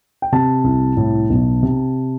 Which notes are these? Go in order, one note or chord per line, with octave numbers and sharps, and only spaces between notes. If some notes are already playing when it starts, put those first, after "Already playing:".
G5
C3 A5
C2
A2
B1
C3